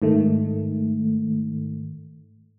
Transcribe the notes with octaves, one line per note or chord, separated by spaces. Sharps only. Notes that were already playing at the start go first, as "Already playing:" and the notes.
G#2 D#3 A3